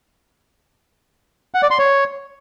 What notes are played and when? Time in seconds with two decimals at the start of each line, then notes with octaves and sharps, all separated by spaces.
1.54 F#5
1.63 D5
1.71 C6
1.79 C#5